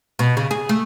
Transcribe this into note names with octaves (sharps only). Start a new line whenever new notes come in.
B2
C#3
G#4
A3